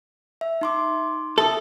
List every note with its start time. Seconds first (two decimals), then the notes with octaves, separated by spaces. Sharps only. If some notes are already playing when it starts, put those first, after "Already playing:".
0.41 E5
0.61 D#4 C6 D6
1.38 A4 E5 D#6